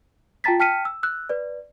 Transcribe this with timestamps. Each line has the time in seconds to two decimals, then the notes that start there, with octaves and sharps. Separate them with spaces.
0.44 F4 G5 A5 A#5 A6 B6
0.60 G5 A5 F6 B6 C#7 D#7
0.85 E6
1.03 E6 F#6
1.29 B4 D5